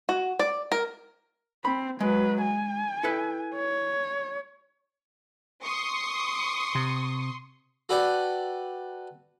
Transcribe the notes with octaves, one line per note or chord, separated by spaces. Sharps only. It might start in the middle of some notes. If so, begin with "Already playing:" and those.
F#4
D5
A#4
C4 B5
F#3 G#3 B4
G#5
E4 A4 B4
C#5
C6 C#6 D#6
C3
F#4 A4 B4 D5 G5